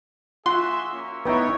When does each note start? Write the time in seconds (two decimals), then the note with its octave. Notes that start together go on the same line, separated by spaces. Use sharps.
0.46 F4 F#4 G#4 E5 F#5 C6
0.92 A#3 C#4
1.25 B3 D#4 E4 B4 C#5 G5